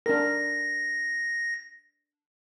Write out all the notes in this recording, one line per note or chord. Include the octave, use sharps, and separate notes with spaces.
D4 A#4 A#6